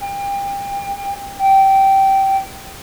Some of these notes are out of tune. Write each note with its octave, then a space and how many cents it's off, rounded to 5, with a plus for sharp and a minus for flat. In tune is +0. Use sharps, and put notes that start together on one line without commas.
G5 +30
G5 -15